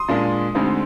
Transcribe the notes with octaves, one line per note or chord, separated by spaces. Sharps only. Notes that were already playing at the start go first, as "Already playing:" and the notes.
Already playing: C6 D#6
A#2 G#3 D4 F4
D2 D3 G#3 C4 D#4